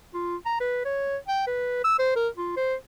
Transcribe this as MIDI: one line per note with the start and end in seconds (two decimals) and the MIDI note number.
0.14 0.36 65
0.45 0.59 82
0.60 0.82 71
0.85 1.17 73
1.28 1.46 79
1.47 1.84 71
1.84 1.96 88
1.99 2.16 72
2.16 2.29 70
2.37 2.52 65
2.56 2.75 72